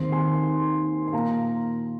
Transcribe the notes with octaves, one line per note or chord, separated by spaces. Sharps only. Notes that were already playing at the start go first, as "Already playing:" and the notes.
Already playing: D#2 D#3 C4 C6
G#5 C6
C6
A#2 A#3 F5 A#5